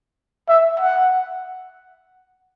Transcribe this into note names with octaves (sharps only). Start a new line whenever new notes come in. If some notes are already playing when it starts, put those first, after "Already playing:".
E5
F#5